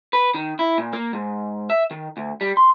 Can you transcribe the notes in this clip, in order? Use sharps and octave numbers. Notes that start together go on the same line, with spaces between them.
B4
D#3
E4
A#2
A#3
G#2
E5
D#3
D2
G3
C6